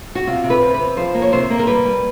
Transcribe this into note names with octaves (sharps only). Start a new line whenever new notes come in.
F#4
C3 F4
C3
B4
C3
C3 B4
F3 C5
A#3
C#5
C3 C5
A#3
A#4
G3 B4
G3